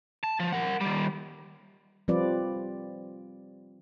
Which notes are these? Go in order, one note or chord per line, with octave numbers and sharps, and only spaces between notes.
A5
F3
A#4 F#5
D#3 G3
F3 G3 C4 F4 B4 D5